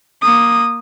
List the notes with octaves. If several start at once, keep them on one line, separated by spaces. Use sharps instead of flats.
A#3 D#6